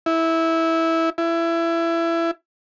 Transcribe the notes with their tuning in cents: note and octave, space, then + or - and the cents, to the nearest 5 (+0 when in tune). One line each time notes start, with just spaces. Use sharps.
E4 -15
E4 +20